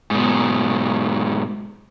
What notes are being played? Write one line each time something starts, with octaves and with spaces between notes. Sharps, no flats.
G#2 B2